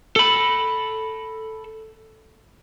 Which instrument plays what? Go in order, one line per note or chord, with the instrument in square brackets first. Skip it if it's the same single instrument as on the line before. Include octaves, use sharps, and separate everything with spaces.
[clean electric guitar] A4 B5